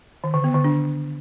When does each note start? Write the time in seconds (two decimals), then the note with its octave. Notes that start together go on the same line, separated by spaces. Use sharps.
0.24 D#3
0.34 D3
0.44 B3
0.54 D3
0.64 D4